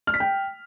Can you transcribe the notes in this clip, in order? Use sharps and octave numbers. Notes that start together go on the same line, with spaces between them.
F6
B6
G5